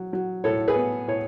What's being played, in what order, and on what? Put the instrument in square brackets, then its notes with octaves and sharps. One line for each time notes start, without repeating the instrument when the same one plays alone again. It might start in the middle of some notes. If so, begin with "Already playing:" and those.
Already playing: [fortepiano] F#3
F#3
A2 A4 C#5
G#4 B4
B3
A2 C#5